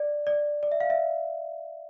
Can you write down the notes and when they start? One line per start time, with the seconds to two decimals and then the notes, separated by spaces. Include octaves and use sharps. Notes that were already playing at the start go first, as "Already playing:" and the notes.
Already playing: D5
0.27 D5
0.63 D5
0.72 E5
0.80 F5
0.90 E5